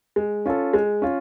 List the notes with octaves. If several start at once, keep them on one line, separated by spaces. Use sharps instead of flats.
G#3
C#4 F4 A4
G#3
C#4 F4